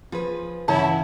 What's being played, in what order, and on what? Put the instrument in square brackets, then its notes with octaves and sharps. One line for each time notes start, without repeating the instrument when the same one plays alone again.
[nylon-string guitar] F3 G#4 B4 [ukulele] F4
[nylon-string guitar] G2 C#3 E3 [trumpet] E4 [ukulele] C#5 F#5 A5